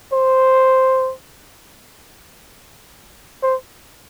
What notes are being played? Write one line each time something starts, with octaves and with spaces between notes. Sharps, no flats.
C5
C5